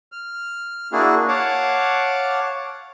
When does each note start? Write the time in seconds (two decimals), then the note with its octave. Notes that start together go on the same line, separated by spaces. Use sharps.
0.12 F6
0.92 A#3 D4 E4 F#4 G#4
1.28 C#5 F5 F#5 A5 D6